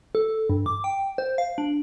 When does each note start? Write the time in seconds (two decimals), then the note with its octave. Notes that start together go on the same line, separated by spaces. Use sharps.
0.15 A4
0.50 G2
0.66 D6
0.84 G5
1.18 C5
1.38 F5
1.58 D4